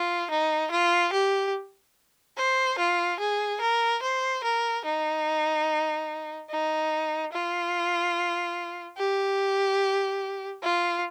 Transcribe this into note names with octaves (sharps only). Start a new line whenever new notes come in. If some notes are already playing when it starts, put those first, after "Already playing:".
Already playing: F4
D#4
F4
G4
C5
F4
G#4
A#4
C5
A#4
D#4
D#4
F4
G4
F4